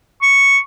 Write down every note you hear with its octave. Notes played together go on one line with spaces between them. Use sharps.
C#6